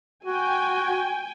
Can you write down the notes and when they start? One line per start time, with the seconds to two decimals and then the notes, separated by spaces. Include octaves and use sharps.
0.25 F#4 G5 G#5